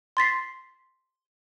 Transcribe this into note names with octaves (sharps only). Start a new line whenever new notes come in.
C6 A6 B6 C7